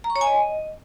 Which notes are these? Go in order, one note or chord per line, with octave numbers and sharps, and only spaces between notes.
A#5
C#6
C#5
G#5
D#5